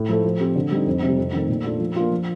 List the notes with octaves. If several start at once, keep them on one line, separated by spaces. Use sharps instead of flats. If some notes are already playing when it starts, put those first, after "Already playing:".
Already playing: A2
F3 A3
F3
C4 G4
D3
G3 C4 D#4
F2
C3 G3
F2
D#3 A3
A#2
A3 D4 F4
F3
A#3 D4 F4
F3